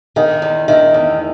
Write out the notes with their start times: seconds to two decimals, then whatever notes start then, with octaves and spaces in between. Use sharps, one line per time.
0.16 D#3 D#5
0.42 E2
0.68 D#3 E5
0.94 E2